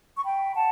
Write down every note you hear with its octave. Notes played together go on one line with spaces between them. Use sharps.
C#6
G5 B5
F#5 A5